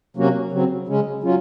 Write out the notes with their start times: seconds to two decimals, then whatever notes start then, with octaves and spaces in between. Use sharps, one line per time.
0.17 C3 F#3 A#3 C#4 F#4
0.52 C#3 F#3 C4
0.87 C#3 G#3 C#4
1.23 F#3 C#4 F4